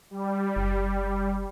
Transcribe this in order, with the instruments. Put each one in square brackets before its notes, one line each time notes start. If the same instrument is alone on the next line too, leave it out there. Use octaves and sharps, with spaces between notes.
[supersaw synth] G3
[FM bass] F#1